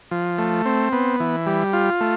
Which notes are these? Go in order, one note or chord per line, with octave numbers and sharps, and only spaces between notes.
F3
A3
C4
B3
E3
G3
F4
A3